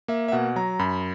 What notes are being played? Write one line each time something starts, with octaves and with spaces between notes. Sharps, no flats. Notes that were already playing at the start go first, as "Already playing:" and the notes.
A#3 E5
E5
B2 F#5
F#3 A#5
F#2 B5